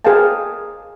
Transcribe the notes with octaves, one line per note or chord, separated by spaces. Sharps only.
G#4 A#4 C5 F5 G5 A5